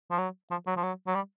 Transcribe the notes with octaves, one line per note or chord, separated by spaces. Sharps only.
F3
F#3
F3
F#3
F3
F#3
F#3
G3